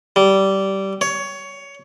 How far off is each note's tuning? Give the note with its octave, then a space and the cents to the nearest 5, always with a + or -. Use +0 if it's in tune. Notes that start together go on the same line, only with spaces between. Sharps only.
G3 -15
C#5 +15